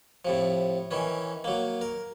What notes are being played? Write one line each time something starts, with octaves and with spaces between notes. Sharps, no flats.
A2 C3 F3
D#3 E3 C#4
F#3 A#3
A#4